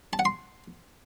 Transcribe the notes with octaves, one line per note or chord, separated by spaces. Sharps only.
A5
F#5
C6